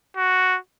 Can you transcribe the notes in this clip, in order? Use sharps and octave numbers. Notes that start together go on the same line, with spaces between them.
F#4